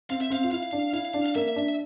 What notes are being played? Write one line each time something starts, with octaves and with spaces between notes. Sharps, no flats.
C4 F5
E5
C4 F5
F4
E4 F5
D4
E4 F5
D4
F5
A#3 E5
D4